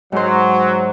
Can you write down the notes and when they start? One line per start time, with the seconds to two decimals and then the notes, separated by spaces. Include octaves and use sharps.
0.12 G#2 F#3 C5